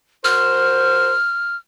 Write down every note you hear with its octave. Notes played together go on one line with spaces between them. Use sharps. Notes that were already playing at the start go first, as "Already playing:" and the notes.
F#4 A#4 C5 F6